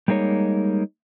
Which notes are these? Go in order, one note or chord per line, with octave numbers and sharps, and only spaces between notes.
G3 G#3 A#3 D#4 C#5